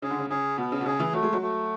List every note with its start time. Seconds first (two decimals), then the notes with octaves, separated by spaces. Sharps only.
0.02 C#3 G#4
0.10 D3
0.18 C#3
0.30 C#3 G#4
0.58 B2 B3
0.72 C#3
0.81 B2
0.86 C#3 G#4
1.00 E3
1.13 F#3 A3
1.23 G#3
1.33 F#3
1.42 A3